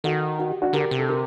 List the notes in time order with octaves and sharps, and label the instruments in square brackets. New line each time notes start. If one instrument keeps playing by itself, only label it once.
[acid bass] D#3 [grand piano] F#4 A4
[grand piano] F#4
G4
D4 F#4
[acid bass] D3 [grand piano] G4 A#4
[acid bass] C3
[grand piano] A4
G4 A#4